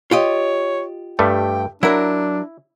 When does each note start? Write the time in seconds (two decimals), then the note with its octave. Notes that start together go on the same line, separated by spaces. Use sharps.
0.11 F4 G4 C#5 D#5
1.19 G2 G3 A3 G5
1.83 F#3 D4 E4 A#4